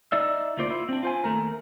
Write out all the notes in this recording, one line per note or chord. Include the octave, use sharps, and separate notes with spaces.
D#4 D5 E5
D2 A#3 F4 C5 D5
E4 F4
C4 D4
F4 C5 G#5
D#2 C3 A3 A#4